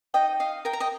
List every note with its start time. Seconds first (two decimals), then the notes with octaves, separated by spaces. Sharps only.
0.14 D#4 D#5 G5
0.40 D#5 F5
0.65 A#4 G5
0.73 A#5
0.80 D#5 G5